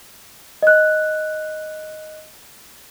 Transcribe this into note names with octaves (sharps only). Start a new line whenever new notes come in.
D#5 F#6